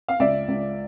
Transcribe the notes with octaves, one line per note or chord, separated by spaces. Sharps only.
F5
C#2 D5 E5
C#2